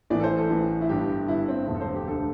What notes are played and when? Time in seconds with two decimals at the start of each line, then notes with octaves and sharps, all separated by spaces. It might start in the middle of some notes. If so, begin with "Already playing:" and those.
0.10 A1 A2 E3 D5
0.20 A4
0.24 C5
0.37 A4
0.50 A1 A2 E3
0.81 E4
0.89 G1 G2 D3 G4
1.28 G1 G2 D3 E4
1.49 C4
1.68 E1 D2 D3
1.74 A4
1.81 C5
1.95 G4
2.07 E1 D2 D3 A4